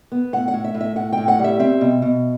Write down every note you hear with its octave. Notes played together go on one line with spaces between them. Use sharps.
B3
A2 F#5
F#5
A2
E5
A2
E5
A2 F#5
A2 G5
F#5
G3
E5
C4 E5
B2
B2